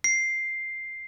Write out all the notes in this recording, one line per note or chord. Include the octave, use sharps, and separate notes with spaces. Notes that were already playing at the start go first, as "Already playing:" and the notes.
C7